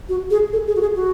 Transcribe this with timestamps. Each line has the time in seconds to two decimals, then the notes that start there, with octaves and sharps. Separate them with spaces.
0.08 F#4
0.30 G#4
0.53 A4
0.67 G#4
0.75 F#4
0.81 G#4
0.95 F#4